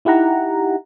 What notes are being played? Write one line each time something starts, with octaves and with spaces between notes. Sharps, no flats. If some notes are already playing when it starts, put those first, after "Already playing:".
D#4 E4 G4 F#5 A#5